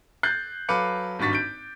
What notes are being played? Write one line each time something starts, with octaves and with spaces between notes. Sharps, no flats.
F#6 G6 A6 C7
F#3 A4 B4 F5 D6 C#7
G#1 G2 F#4 C#6 A6 B6
G6 D7